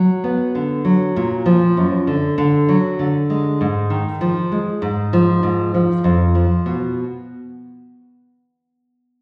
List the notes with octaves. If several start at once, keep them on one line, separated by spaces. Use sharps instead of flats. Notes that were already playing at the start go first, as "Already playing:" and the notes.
Already playing: F#3
B3
D3
F#3
A#2
F3
F#2
D3
D3
F#3
D3
G#3
G#2
D#3
F3
G#3
G#2
F3
G#2
F3
F2
F3
B2